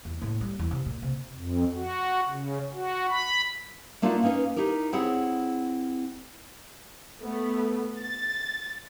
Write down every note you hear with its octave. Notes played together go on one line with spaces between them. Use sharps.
E2
A2
G3
E2
C3
A#2
C3
F2
F#4
C#3
F#4
B5
A3 A#3 D4 D#4 F4 F#4
A#3 C#4 D#4 B4 D#5
D#4 E4 G4 A#4
C4 E4 G#4 C#5 F#5
A3 B3
A6